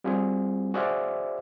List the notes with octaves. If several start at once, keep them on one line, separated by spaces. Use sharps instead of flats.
G3 C4 F4 F#4 G#4
F#4 G#4 C5 D5 E5 F5